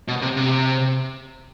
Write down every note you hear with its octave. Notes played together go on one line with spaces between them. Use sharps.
B2
C3
C3